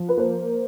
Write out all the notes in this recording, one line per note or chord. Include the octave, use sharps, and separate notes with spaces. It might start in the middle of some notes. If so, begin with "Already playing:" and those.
Already playing: F3
B4
A#3 C5